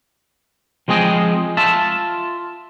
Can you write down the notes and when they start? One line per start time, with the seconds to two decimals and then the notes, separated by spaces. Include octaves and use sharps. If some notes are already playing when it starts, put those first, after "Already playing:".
0.88 F3 G#3 C4 G#4 D#5 G5
1.57 F4 E5 A5